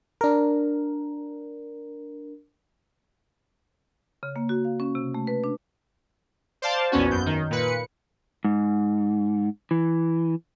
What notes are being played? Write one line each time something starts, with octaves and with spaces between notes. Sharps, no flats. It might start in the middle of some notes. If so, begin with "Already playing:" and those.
D4 A#4
C#3
A#3
F#4
F5
C#4
C3
A3
B4
D4
C5 D5 F5 A5
A#1 E2 B3 C#4 F#4
F#2 G6
D#3
A#2 B4 C#7
G#2
E3